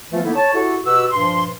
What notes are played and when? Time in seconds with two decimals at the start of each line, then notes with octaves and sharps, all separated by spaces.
0.12 E3 F3 A3 B3 F4
0.24 D3 A#3 B3 D#4 E4
0.36 C#5 A5
0.54 E4 F#4 G4 A4
0.84 B2 F#4 G4 B4 E6
1.12 G2 A#2 F3 C6